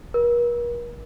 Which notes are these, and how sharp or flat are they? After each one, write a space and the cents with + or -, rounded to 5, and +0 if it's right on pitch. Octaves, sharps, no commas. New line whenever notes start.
A#4 +45